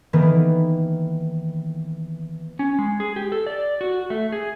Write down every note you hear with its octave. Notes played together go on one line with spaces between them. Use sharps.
D#3 E3 A#3 B3
C#4
G#3
G#4
G4
A4
D5
F#4
A3
G#4